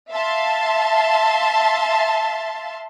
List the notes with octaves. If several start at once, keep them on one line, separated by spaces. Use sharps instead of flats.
E5 F5 A5 C6